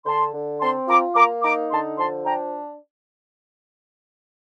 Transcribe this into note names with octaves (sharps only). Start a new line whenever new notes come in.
D3 A5 C6
D3
C4 A5 C6
F4 A#5 D6
A#3 A#5 D6
D#4 A#5 D6
D3 A5 C6
F3 A5 C6
D4 G5 A#5